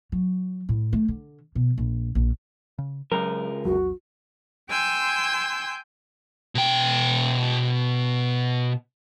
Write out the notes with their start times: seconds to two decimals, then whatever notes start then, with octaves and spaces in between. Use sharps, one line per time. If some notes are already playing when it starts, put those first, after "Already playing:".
0.12 F#3
0.69 A2
0.93 A3
1.08 D3
1.55 B2
1.78 A#1
2.15 A#1
2.78 C#3
3.12 C#2 F#3 A#4
3.65 A#1 E2 F#3 F#4
4.69 G5 G#5 C6 E6 G6
6.55 B2 G5